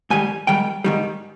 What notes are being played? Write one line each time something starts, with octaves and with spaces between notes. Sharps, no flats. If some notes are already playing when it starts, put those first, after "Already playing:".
G#2 D#3 G3 G#5
G#2 D#3 G3 G5
G#2 D#3 G3